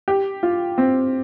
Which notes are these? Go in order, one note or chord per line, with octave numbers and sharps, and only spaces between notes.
G4
F4
C4